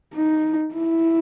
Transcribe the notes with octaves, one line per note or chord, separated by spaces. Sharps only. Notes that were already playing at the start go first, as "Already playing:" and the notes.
D#4
E4